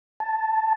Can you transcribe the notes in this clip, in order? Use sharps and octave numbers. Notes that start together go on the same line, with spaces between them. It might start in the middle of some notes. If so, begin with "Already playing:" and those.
A5